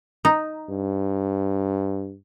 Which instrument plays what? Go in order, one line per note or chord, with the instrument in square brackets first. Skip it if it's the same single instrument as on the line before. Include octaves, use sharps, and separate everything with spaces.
[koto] D#4
[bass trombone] G2